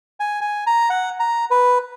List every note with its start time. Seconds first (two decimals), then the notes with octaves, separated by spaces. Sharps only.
0.20 G#5
0.41 G#5
0.67 A#5
0.90 F#5
1.20 A#5
1.51 B4